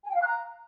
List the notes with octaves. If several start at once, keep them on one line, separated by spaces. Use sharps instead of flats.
G#5
G5
F5
F#6
A#5